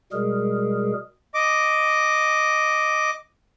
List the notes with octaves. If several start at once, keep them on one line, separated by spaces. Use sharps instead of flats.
B2 G3 G#3 G#4 A#4
D#5 D6